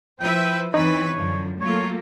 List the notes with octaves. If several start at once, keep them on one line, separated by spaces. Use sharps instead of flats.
F3 E4 B4 C5 E5 G5
E2 E3 C4 D#4 B4 C#5 B5
F#2 D3 F3
F#3 A3 A#3 F4 A4 C#5